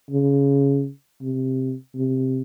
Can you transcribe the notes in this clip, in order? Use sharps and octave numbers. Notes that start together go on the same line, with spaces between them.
C#3
C3
C3